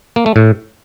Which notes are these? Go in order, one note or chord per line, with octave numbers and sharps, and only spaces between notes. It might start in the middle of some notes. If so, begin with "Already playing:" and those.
A#3
A3
A2